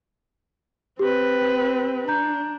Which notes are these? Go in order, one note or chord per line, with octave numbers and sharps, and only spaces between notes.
C4 G4 B4
D4 A#5 G6